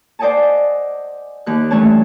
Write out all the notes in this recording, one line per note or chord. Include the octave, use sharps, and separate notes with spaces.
C5 D5 D#5 F#5 G#5 A5
D#2 F#6
G2 E3 A3 C#4 C#5 A5